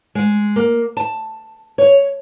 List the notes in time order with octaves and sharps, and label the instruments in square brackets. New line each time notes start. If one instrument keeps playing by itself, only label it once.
[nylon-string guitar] G#3
A#3
A5
C#5